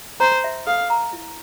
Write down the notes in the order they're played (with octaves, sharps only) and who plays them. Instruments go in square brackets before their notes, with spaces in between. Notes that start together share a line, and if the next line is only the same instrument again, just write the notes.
[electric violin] C5 [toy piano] A#5
[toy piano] E5
[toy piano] A4 [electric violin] F5
[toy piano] A#5
E4